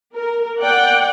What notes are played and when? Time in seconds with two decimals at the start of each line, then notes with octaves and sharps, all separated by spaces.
0.15 A#4
0.60 D5 F#5 G5